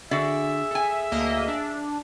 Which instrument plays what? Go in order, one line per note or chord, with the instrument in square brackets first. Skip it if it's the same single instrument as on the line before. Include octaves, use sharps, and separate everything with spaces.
[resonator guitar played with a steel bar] D3 F#4 D5 [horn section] G#4 E5
[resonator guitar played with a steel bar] A4 G#5
[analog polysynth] D2 A#3 D#5
D4